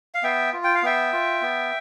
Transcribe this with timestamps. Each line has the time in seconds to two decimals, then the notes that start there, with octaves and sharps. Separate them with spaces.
0.15 F5
0.23 B3 E5 G5
0.53 F4
0.64 G5
0.75 F5
0.83 B3 E5 G5
1.13 F4
1.42 B3